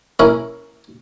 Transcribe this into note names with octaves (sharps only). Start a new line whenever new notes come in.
C#4 E4 A#4